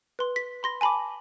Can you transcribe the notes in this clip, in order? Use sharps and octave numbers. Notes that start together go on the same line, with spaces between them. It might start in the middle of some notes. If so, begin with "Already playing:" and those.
B4 C6
B6
B5 C6 A#6
G#5 A5 B5 C6 D6